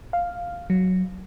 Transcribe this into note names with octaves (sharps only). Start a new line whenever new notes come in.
F5
F#3